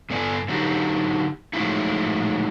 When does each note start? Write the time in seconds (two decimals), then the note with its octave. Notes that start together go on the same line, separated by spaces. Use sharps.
0.10 G2 B3 A4 D5 G#5
0.48 D3 F#3 D#4 G4
1.53 F3 F#3 G#3 A3 D#4 E4